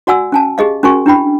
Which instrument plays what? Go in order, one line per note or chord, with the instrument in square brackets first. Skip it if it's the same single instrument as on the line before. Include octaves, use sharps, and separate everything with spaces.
[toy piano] F#4 D5 F#5 G#5 E6
C#4 G#5 A5
G4 G#4 D#5 F5
C#4 F#4 A#4 G#5 C#6
D4 E4 G5 B5